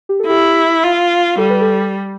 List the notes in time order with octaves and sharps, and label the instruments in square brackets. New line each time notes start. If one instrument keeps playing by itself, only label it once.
[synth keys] G4
A4
[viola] E4 [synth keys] G4
[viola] F4
[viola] G3 [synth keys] A4
[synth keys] B4
A4